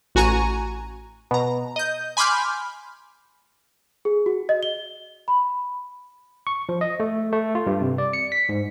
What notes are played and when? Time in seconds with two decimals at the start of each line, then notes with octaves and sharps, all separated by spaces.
0.15 A1 F#4 G#5 A#5 C#6 D#7
1.31 B2 A#5
1.76 D#5 G6
2.17 G#5 B5 C6 D6 F6 G6
4.05 G#4
4.26 F#4
4.49 D#5
4.63 G7
5.28 B5
6.47 C#6
6.69 F3
6.81 D#5
7.00 A3
7.32 A3
7.55 F4
7.66 G2
7.81 C3
7.98 D5
8.13 C#7
8.32 B6
8.49 G#2